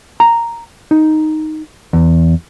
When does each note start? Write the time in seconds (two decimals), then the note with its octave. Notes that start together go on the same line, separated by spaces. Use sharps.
0.20 A#5
0.91 D#4
1.93 E2